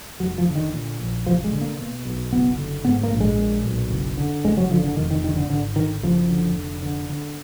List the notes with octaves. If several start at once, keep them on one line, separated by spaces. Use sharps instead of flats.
F1 F#3
F3
D3
D#3
A#2
A#1
F#1 F3
G#3
D3
A#3
B2
B1
F#1 B3
D3
G#2 B3
A#3
A#1
G#3
A#2
B1
F#1
D3
F#1 G#3
F#3
D3 F3
D3
F1 D#3
D#3
D3 D#3
D3
G#1 D3
D3 D#3
F#1 F3
D3
F1
D3
D3